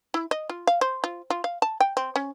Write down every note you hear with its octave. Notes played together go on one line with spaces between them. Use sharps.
E4
D#5
F4
F5
C5
F4
F4
F5
A5
G5
C4
C#4